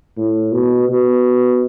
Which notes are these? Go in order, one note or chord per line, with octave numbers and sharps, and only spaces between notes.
A2
B2
B2